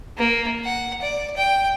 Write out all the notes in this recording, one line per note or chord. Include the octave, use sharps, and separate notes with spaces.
A#3
F#5
D5
G5